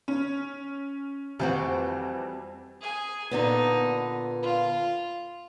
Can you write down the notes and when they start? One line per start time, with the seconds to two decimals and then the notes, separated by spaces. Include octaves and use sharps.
0.08 C#4
1.40 F2 E3 G3 C4 F#4
2.81 G#4 G#5
3.31 A#2 D3 B3 D#4
4.42 F4